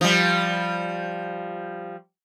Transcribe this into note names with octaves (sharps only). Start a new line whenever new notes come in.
F3 G3